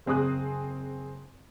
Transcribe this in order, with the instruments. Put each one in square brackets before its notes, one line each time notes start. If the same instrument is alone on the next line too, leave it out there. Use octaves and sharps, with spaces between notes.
[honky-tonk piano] F#1 C4 G#4 D#6 F#6